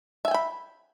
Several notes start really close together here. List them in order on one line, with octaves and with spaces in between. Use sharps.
E5 G#5 G5 B5